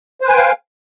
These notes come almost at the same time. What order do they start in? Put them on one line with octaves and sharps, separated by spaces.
C5 B4 G#5 G5 F5